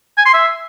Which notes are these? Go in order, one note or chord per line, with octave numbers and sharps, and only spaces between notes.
G#5
C6
E5